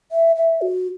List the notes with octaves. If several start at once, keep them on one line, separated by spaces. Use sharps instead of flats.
E5
E5
F#4